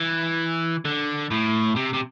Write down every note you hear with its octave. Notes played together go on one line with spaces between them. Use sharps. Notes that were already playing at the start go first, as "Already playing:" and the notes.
Already playing: E3
D3
A2
C3
C3